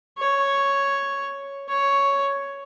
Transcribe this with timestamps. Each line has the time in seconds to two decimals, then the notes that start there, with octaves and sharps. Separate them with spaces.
0.18 C#5
1.69 C#5